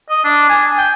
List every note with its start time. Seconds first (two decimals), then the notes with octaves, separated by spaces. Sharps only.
0.09 D#5
0.24 D4
0.49 G#5
0.78 G5